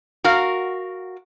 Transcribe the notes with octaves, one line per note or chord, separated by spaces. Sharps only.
F#4 A#4 F5